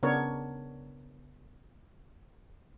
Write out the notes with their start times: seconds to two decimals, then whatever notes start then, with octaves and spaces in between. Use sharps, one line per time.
0.03 C#3 B3 D4 A#4 C#5